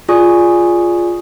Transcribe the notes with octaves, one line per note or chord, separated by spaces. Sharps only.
F4 G#4 D5 G#5 C#6 D#6